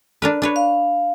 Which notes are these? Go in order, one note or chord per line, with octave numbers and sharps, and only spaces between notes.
D4 A#4 B4
D4 B4 C#5
F5